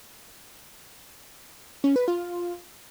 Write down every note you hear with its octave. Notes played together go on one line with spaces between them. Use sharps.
C#4
B4
F4